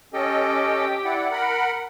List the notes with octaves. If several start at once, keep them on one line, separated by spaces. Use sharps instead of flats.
C#4 G4 A4 D#5
E4 D5 F#5
A#4 F#5 B5